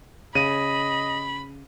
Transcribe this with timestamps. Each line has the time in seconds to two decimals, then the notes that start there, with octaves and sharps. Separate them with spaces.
0.35 C#3 D#5 B5 D#7